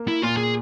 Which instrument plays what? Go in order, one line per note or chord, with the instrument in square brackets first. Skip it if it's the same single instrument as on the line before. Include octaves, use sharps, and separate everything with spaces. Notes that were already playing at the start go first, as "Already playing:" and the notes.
Already playing: [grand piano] A#3
[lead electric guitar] E4
[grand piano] A#2 [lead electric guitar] F4
[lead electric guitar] G#4